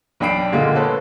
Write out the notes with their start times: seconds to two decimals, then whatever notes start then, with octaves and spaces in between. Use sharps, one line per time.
0.20 B1 D4 G5 B5 C7 D7
0.52 A#2 D3 G#3 F4
0.75 G#3 A4 B4 C#5